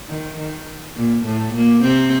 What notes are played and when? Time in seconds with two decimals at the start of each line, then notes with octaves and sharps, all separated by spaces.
0.09 D#3
0.38 D#3
0.96 A#2
1.25 A2 A3
1.54 A#2 A#3
1.84 C3 C4